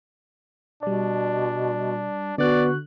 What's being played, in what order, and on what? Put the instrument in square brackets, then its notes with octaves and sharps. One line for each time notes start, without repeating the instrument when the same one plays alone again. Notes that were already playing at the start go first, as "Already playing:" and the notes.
[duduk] B2 [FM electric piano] G3 D5 [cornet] D4
[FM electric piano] D3 F#6 [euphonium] B3 [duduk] F#4 [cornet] D5